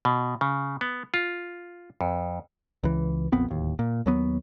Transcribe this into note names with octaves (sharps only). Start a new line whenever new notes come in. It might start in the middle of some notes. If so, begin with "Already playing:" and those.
B2
C#3
B3
F4
F2
C#2 E3
A#1 F2 B3 C4
D1 D#2
A#2
D#2 F#3 B3